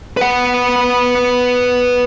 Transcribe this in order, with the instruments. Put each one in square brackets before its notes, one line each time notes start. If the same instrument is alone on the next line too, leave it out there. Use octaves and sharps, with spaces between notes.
[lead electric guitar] B4 F#5